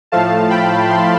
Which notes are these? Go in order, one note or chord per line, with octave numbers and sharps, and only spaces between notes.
A2 F3 A3 F5 A5
G5 B5
C6